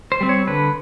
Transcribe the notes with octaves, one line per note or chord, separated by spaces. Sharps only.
C5
G3 C4
C#5
D3 B4